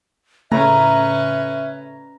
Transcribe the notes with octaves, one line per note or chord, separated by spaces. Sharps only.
A2 C#3 A3 C#4 B4 E5 A#5